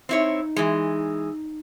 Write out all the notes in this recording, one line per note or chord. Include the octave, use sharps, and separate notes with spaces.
C4 D#4 E4 C#5
E3 G#3